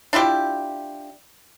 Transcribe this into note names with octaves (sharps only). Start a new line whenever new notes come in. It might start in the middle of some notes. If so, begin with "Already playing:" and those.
D4 E4 F4 G4